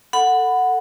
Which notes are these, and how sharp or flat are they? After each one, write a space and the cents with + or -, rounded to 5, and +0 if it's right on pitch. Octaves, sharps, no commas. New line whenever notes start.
A4 +20 F#5 -5 B5 +15